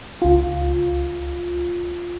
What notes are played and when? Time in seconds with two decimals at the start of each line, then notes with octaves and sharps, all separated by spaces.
0.22 C#2 F4